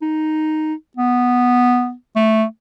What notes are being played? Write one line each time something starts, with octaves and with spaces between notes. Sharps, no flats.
D#4
B3
A3